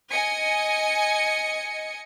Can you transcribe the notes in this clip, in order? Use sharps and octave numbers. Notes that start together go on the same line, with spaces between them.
D#5 G#5 C#7